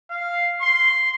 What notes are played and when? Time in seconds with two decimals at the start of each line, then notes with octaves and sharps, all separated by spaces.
0.11 F5
0.62 C6